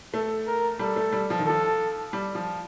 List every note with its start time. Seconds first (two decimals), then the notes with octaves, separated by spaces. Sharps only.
0.14 A3 A4
0.47 A#4
0.79 G3 A4
0.96 A3
1.13 G3
1.30 F3
1.39 D#3
1.46 F3 A4
2.13 G3
2.35 F3